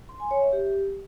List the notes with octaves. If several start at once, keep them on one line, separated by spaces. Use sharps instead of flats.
C6
G#5
C#5
E5
G4